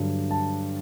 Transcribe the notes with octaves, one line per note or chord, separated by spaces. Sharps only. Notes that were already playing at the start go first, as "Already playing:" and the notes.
Already playing: G2 D3 F#3
A5